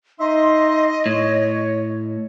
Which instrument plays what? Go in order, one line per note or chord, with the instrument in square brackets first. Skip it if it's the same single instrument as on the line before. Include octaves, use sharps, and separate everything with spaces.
[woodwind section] D#4 E5 C6 [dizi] D#5
[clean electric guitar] A2 [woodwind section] C#5